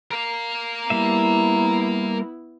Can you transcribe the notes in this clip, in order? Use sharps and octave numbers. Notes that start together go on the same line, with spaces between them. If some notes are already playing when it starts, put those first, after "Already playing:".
A#4 F5
G3 A#3 B3 E4 E5